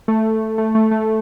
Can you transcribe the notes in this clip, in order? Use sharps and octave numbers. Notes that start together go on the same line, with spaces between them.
A3
A3
A3
A3